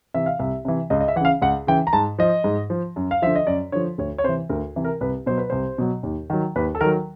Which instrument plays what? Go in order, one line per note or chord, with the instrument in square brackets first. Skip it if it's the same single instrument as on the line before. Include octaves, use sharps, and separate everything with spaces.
[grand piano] C3 E3 E5
F5
C2 E5
C3 E3
C#2 D#5
D#5
E5
E3 F#5
C#3 F5
C#2 F#5
C#3 E3 G5
A#5
G#2 A5
F3 D#5
G#2
F3
F#2
F5
D3 F3 E5
D#5
F#2 D5
D3 F3 C#5
D2 C#5
C#5
C3 C5
E3
D2 A#4
C3 E3
A#4
C2 B4
B2 F#3 C5
B4
C2 C5
B2 F#3
D#2
D#3 F#3
D#2 B4
A4
D#3 F#3 A#4